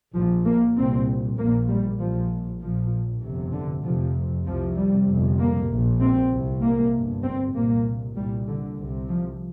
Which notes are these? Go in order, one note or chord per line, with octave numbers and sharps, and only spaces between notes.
A#1 A#2 F3
A#3
C2 A#2 C4
A#1 A#2 A#3
G3
A#1 A#2 F3
A#1 A#2 F3
G1 F2 C3
D3
F1 F2 C3 F3
C2 C3 F3
G3
G1 F2 C3
A#3
A#1 A#2
C4
C2 C3
A#3
G1 G2
C4
C2 A#2 A#3
C2 A#2 G3
D3
C2 C3
F3